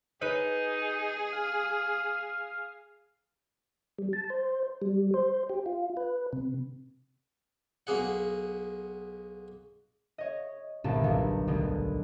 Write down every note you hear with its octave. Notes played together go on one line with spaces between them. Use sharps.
D#4 G#4 B4
F5
G3
A5
C5
G3
C5
G4
F4
B4
C3
B1 A#3 G#4 F#5
C#5 D#5
G1 C2 A#2 A#3 B3 A5
B1 D#3
D2 B2 D#3